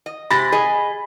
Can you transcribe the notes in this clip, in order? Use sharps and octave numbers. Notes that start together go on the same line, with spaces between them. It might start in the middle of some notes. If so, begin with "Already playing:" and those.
D#5
C3 G#3 G4 B5 A6 A#6
G#4 D#5